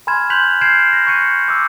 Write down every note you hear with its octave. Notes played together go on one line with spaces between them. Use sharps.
G#5 B5 C6 F6 G#6 E7
C6 F#6 G6 B6 F7 F#7
F6 G6 G#6 C7 D7 E7
A#6
C#6 F#6 G6 C#7 D#7
D6 E6